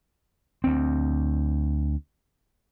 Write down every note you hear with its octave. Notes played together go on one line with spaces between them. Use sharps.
D2 C4